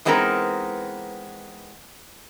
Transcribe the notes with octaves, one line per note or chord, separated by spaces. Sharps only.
E3 G#3 B3 C4 D#4 A#4